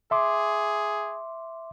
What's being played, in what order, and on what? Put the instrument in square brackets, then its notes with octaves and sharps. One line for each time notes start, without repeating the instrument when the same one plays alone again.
[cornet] G#4 [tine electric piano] E5 C6 D6